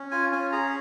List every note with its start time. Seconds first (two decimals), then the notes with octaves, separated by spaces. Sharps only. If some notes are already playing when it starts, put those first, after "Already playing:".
Already playing: C#4
0.11 F4 G#5
0.32 C#4 G#5
0.52 G#4 A#5